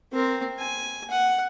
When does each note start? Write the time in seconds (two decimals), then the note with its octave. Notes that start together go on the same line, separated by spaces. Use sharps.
0.12 C4 A#4
0.59 G#5
1.10 F#5